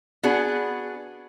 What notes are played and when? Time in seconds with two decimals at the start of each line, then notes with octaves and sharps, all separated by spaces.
0.23 B3 D4 F#4 G#4